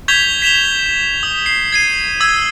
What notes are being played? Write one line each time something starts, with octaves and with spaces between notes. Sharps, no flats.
C#6 G6 G#6 B6 F7 G7
B6 E7 F7 G7
D#6
C7
G#6 C7 D#7
D#6 E6 G#6